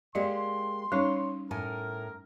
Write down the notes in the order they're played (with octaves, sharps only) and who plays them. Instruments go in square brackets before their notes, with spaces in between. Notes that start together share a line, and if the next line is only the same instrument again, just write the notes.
[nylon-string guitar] G#3 A#3 G4 [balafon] D5 D#5 [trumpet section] C6
[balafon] G3 C#4 D#4 [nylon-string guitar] C#5
[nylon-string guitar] A2 G#5 [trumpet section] A#4